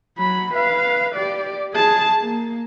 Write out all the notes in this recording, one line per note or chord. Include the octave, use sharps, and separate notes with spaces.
F#3 B5
B4 F5
G4 D5
G#4 A5
A#3